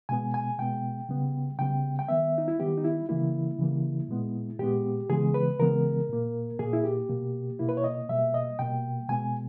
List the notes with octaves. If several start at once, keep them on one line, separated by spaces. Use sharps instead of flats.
B2 G#3 B3 G#5
G#5
B2 G#3 B3 G5
C#3 G3 B3
C#3 G3 B3 G5
G5
D#3 G3 B3 E5
D#4
E4
D#3 G3 B3 G4
D#4
E4
C#3 E3 G3 A#3 E4
C#3 E3 G3 A#3
A#2 G#3 B3
A#2 G#3 B3 G4
C#3 E3 G#3 B3 G#4
B4
C#3 E3 G#3 B3 A#4
A#2 A#3
A#2 A#3 G#4
E4
G4
B2 A#3
B2 A#3 E4
B4
C#5
D#5
B2 G3 A#3 E5
D#5
B2 G3 A#3 G5
B2 G#3 B3 G#5